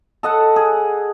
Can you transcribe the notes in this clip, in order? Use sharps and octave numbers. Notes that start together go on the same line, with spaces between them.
A4 D#5 F#5 A5
G#4